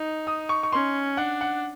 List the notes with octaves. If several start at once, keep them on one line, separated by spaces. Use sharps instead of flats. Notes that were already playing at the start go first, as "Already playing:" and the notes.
Already playing: D#4
D#6
C#6
C#6
C#4 C6
D4 F#5
F#5